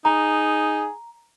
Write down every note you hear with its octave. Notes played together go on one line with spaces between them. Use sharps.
D#4 G#4 A#5